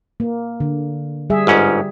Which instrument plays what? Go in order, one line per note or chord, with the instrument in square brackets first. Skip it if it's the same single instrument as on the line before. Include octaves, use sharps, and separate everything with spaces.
[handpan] A#3
D3
G3 G#4 E5
[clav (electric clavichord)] G1 G#2 C#4